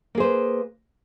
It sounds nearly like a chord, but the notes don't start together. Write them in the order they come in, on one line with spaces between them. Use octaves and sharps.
A#3 G#4 C5 B4